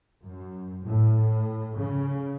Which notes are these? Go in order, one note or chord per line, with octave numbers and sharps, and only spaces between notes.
F#2
A2
C#3